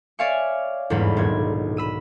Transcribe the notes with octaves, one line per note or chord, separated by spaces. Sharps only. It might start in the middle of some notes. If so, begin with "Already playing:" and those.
C#5 D5 E5 F5 G#5 C#6
G1 E2 G#2 A#3 B3 B5
D#1 B1 G#6
B5 E6 D#7